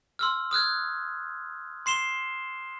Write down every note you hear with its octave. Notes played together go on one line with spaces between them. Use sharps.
C6 E6 F6
D#6 F6 F#6 G#6
C6 C7 E7 G7